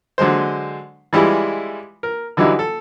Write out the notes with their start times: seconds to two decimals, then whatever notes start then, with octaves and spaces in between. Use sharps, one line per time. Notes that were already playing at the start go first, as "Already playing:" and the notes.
0.18 D3 F#3 G#3 C5
1.13 E3 G3 G#3 E4 F4
2.03 A#4
2.37 D3 E3 F#3 G3 D#4 E4
2.59 A4